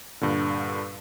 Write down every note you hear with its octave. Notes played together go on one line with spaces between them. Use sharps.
G2 A#2 D3